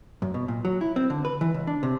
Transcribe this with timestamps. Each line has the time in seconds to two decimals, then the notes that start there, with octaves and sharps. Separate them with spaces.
0.22 F#2
0.34 B2
0.48 A#2
0.65 F#3
0.81 E4
0.96 C4
1.10 D3
1.25 B4
1.41 E3
1.54 C#2
1.67 D4
1.83 C3